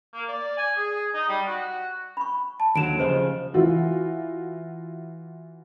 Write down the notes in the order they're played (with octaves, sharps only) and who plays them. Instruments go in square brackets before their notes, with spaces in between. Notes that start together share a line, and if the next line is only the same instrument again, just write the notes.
[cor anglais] A#3
D5
G#5
G#4
D#4
G3
F#4
[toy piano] B5 C#6
[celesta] A5
[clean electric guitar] D#2 D3 F#3 [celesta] D7 E7
[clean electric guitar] C#3 F3 [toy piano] G4 C5 D#5
[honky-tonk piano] E3 F4 F#4